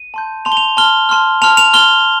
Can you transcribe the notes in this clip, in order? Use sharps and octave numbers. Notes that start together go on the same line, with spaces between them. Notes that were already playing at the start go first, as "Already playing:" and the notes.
Already playing: D#7
A5 C6 G6
A5 C6 G6 F7
G7
F7
A5 C6 F6 G7
A5 C6 F6
A5 C6 F6 F7
F7
A5 C6 F6 G7